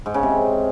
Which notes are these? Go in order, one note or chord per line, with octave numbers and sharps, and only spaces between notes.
G#2
C#3
C3